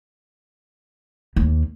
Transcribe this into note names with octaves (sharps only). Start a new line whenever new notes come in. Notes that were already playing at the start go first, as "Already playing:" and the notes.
D#2